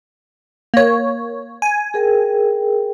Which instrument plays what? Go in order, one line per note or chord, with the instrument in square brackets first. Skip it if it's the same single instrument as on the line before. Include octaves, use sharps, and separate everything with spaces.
[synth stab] A#3 C#5
G#5
[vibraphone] G#4 A#4 G5